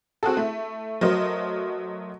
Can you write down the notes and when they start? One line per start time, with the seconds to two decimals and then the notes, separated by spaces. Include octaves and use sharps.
0.23 C4 F#4 G#4 A4
0.37 A3 E4
1.01 F#3 A3 A#4 C5 D#5